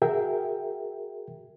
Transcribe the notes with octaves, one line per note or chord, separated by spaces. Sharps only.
F#4 G#4 A#4 E5 G5